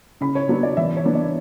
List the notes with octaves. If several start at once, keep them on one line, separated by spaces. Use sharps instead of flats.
C#3 B5
C#5
F#3 B3 D4
D5
E3 E5
C#5
B3 D4
D5